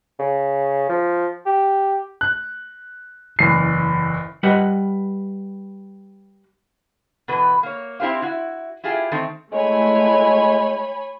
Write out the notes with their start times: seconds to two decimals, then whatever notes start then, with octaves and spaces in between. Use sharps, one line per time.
0.19 C#3
0.89 F3
1.46 G4
2.21 F#6
3.39 F#1 E2 C7
4.43 G3 B4 D#5 F#5
7.28 B2 E3 B4
7.63 A#3 C#5
8.00 C4 E4 G4 C5 F5
8.22 E4 F#4
8.84 E4 F4 G4 G#4
9.12 D#3 A3 C4
9.52 G#3 A3 E4 F#4 C#5 G#5 B5